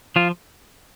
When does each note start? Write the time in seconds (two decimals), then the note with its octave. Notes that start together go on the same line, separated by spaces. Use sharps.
0.16 F3 F4